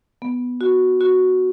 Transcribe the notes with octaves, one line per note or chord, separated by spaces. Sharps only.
B3
F#4
F#4